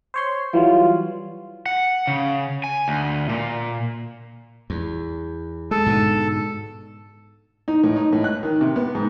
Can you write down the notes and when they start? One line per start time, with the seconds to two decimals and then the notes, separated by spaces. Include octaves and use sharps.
0.14 C5 C#5 C6
0.54 E3 F#3 G3 F4
1.66 F#5
2.07 C#3
2.64 G#5
2.88 D2
3.29 A#2
4.70 E2
5.71 G#3 A4
5.86 G#2 B2 D3
7.68 D#4
7.84 A2
7.96 D#4
8.13 A2
8.24 F#6
8.43 D#3
8.61 C3
8.76 B3
8.95 G#2